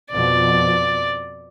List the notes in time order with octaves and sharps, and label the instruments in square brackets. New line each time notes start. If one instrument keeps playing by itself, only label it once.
[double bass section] F2 B2 F3 [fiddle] D5